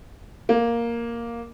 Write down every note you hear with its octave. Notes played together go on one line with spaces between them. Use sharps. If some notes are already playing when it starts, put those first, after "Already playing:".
A#3